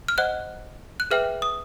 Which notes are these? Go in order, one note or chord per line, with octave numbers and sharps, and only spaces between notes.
F6
C5 D#5 F#5 F#6
F#6
G#4 B4 E5 G5 F6
D#6